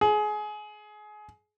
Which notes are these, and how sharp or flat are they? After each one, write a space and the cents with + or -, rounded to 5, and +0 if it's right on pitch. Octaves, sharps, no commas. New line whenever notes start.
G#4 +25